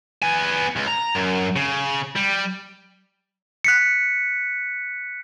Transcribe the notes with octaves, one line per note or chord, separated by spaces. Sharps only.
B3 G#5
C#2
A#5
F#2
C#3
G3
F#6 B6 C#7